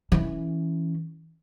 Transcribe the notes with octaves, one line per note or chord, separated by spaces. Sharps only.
E3 C#4